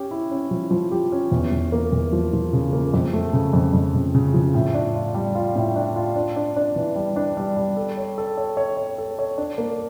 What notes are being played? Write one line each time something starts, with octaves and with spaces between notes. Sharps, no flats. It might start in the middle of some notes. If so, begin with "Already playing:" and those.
Already playing: C#4 G4
E4
C#4
F3
F3
G4
C#4
E2
E2
A#3
E2
F3
F3
C#3
A#3
F2
A3
C#3
F2
F2
C#3
C#3
F3
A2
D4
F4
G3
F4
A2
D4
F4
D4
D4
D4
E3
G3
D4
G3
G3
A4
C#5
A4
C#5
C#5
C#5
A4
C#5
D4
A#3